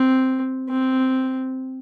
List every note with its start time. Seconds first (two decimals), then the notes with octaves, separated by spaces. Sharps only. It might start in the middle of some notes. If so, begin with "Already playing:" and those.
Already playing: C4
0.69 C4